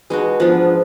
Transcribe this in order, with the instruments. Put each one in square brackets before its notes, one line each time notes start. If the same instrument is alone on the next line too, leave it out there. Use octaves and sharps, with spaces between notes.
[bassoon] B2 [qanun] G#3 D#4 F#4
[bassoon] G#2 [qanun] F3 B3 D4 F4